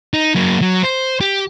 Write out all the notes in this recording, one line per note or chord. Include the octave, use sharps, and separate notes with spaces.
D#4
F#3 A#3
F#3
C5
G4